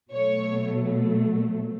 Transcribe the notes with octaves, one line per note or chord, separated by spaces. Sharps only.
B2 F#3 A3 C#5